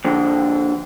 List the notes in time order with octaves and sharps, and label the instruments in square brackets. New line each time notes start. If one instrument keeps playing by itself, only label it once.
[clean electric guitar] F2 D3